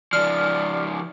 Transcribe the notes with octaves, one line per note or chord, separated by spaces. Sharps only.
C#3 F3 D5 F6